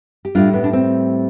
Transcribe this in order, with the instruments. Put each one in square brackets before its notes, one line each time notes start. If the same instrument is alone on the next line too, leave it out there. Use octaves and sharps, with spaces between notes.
[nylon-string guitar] G4
A2 G3 D4 F4
B3 D4
D4
C4